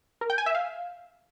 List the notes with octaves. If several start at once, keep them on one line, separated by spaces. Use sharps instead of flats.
A#4
G5
G#5
E5
F5